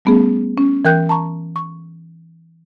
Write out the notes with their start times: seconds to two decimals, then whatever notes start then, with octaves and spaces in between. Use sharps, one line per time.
0.05 G3 A3 B3 C#4 G#4
0.58 C#4
0.85 E3 A#4 G5 F#6 G6
1.09 A5 A#5 C#6
1.56 C#6